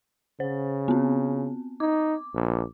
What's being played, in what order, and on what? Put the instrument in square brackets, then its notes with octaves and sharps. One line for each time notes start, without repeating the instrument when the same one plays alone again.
[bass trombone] C#3 [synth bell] C5
[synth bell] B3 C4
[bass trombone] D#4 [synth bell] D6
[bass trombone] A#1